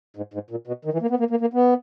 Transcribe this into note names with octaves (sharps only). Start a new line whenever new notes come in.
G#2
G#2
A#2
B2
D#3
E3
A#3
B3
A#3
A#3
A#3
B3